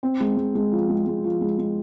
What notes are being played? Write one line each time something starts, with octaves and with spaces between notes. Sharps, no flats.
C4
G#3
G#3
G#3
F3
G#3
G#3
F3
G#3
G#3